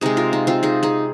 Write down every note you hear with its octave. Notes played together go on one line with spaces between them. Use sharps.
C3 G#3 D#4 G#4
F4 A#4
D#4
C4 F4
D#4 G#4
D#4 G#4